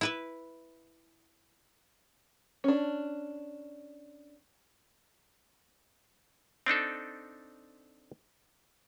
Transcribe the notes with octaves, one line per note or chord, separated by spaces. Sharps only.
E4 B4 E5
C#4 D4
C4 D4 D#4 A4